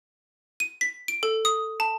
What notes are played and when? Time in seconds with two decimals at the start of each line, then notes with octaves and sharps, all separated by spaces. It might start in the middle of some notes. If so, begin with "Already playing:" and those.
0.60 D#7
0.81 B6
1.08 D7
1.23 A4
1.45 D#6
1.80 A5